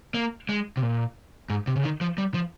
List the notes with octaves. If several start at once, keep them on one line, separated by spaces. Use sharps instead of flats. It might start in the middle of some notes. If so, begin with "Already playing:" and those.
A#3
G#3
C3
A#2
G#2
C3
C#3
D#3
F3
G3
F3